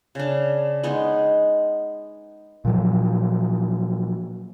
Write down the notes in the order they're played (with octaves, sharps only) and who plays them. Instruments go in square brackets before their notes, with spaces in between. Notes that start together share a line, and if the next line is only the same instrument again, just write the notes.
[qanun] C#3 D4
G#3 B3 C#4 D#4
[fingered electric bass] A#2 F3 F#3